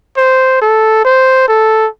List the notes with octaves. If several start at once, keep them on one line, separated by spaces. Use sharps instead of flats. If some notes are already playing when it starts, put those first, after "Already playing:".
C5
A4
C5
A4